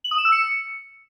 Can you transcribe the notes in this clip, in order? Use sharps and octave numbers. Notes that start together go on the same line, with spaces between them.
F#7
D#6
E7
E6
C#7